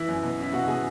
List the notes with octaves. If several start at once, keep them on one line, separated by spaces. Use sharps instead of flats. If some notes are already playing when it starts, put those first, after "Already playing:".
Already playing: E3 E4
F#2
B2
C#4 E4
B2 F#4
B2 G#4